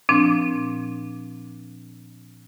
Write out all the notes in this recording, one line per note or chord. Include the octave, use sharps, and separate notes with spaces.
A#2 F3 C4 D4